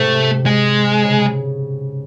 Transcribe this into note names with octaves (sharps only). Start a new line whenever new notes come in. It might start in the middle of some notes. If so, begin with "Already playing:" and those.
Already playing: G#2 C3 A3
G#3
C#3